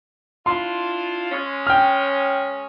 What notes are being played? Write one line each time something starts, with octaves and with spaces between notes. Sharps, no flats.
D4 E4 F4 C6
G#3 C#4
G5 F6